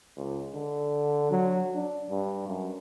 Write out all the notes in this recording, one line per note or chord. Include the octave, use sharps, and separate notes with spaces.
C#2
D3
F#3
D4
G2
F#2